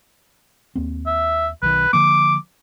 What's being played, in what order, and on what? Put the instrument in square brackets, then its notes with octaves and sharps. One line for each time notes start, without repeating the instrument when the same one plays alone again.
[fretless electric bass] D#2 A#3 C4
[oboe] E5
[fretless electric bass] B1 D#3 [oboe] B4
[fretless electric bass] D3 F3 A#3 [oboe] D6